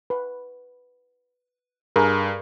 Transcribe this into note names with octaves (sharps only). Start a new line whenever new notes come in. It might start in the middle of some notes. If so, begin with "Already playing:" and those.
B4
G2 G#4 A#4